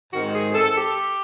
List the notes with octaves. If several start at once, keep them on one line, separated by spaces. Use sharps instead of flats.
G#2 D#3 G#3 C4 F#4
G#4
A4
G4